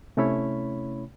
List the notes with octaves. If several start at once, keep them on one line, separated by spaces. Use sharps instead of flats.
C3 A3 C#4 E4 C#5 B5